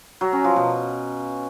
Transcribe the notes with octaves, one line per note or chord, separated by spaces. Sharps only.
F#3
C#4
F3
B2